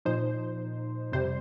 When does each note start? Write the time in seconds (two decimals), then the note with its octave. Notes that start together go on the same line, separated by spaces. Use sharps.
0.05 A#2 F3 D#4 C5
1.12 F2 C3 G3 C5